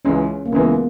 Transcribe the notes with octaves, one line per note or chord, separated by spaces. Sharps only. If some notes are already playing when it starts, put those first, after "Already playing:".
C#2 C#3 E3 G#3 C#4
A#3
C#2 C#3 E3 G#3 B3